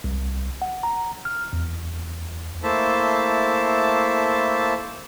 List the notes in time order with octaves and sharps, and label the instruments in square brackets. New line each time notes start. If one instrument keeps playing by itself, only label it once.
[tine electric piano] C2
F#5
A#5
F6
E2
[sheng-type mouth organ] A3 A#3 E4 C5 E5 A5